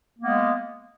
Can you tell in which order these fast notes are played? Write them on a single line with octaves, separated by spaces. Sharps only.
A#3 B3 G#3